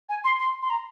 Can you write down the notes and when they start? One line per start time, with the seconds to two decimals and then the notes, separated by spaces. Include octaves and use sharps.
0.09 G#5
0.24 C6
0.39 C6
0.62 C6
0.70 A#5